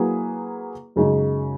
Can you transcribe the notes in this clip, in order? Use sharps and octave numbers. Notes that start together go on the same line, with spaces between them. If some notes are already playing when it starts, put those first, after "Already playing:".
Already playing: F#3 A#3 E4 G#4 B4
F#2 C#3 G#3 D#4